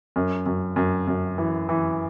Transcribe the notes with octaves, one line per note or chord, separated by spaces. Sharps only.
F#2
F#2
F#2
F#2
E3
E3